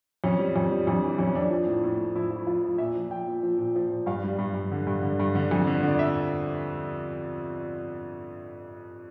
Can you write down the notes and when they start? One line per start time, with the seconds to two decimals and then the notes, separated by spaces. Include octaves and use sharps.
0.24 F2 C#4
0.39 G3
0.56 F2
0.71 G3
0.87 F2 D4
1.02 E3
1.19 F2 C#4
1.35 F2 D4
1.51 F3
1.67 A2
1.84 A2
1.98 A2
2.15 F3 E4
2.30 F3
2.36 E4
2.47 F3 F4
2.64 F3
2.78 A#2 E5
2.95 F3
3.10 F3 G5
3.27 A#2
3.43 F3
3.58 A#2
3.76 F3
3.90 A#2
4.06 G2 F5
4.24 G3
4.39 G2
4.55 G2
4.72 D3
4.87 G2
5.03 D3
5.19 G2
5.35 D3
5.51 F2
5.67 D3
5.83 D3
5.88 D5
5.99 E5